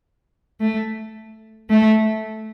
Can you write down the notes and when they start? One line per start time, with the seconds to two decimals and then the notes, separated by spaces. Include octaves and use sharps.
0.60 A3
1.69 A3